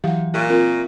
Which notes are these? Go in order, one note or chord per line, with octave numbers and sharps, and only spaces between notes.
E3 F#3 G4 F5 F#5
A#2 G4 E5 C#6
C4 F4 A#4